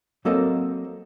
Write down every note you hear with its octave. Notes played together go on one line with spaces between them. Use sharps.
F#3 A#3 C4 A4 A#4 D#5